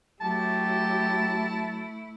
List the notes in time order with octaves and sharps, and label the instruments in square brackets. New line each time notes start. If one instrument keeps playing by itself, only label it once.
[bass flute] F#3 [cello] A3 E4 [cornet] G4 [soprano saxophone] A5